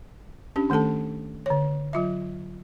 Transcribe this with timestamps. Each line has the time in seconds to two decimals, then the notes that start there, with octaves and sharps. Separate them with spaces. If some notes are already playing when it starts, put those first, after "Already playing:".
0.56 C#4 D4 G4
0.70 D#3 A3 C#4 A4 A5
1.46 D3 C#5
1.93 F#3 F4 E5